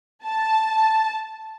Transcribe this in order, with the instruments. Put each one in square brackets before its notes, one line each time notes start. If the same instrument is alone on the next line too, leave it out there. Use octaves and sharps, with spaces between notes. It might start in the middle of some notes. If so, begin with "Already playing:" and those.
[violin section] A5